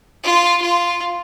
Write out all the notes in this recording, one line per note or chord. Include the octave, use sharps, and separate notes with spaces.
F4
F4